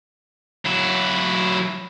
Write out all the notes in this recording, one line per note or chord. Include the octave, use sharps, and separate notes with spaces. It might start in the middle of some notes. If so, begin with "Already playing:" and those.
F#3 E4